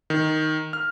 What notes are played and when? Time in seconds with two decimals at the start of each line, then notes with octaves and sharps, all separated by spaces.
0.10 D#3
0.73 F6